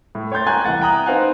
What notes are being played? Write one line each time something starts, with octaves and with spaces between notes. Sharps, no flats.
A2
C#5 G5 C6 G6 A6
G5 G#5 A#5 C#6 F#6 G#6
C2 E3 F#5 A6
G5 A#5 D#6 F#6
B3 C4 D#4 F5 F#5 G#5